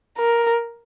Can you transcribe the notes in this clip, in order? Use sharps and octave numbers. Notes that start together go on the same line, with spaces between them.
A#4